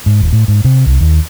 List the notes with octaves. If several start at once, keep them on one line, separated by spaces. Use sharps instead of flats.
G#2
D#1
A2
G#2
C3
C2
D#2